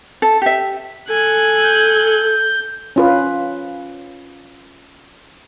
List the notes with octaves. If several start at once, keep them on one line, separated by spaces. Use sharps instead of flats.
A4
G4 E5
A4 G#5 F#6
G6
C#4 F4 B4